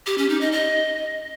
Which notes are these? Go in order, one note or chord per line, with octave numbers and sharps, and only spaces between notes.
G4
C#4
D#4
D#5
D#5